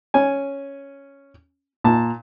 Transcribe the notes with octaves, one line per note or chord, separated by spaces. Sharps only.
C#4 G#5
A#2 A5